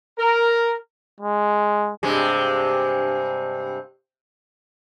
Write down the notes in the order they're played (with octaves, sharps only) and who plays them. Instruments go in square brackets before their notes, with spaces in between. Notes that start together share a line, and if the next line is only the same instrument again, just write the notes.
[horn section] A#4
[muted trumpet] G#3
[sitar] G2 C3 G#3